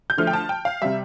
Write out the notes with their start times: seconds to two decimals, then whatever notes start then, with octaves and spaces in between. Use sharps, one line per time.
0.10 G6
0.18 D3 F3 A3 F6
0.27 G5
0.33 A5
0.49 G5
0.65 F5
0.82 C3 G3 E5